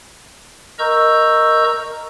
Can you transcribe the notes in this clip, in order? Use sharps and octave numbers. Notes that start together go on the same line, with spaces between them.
A#4 D#5 A#5 C#6 E6 G6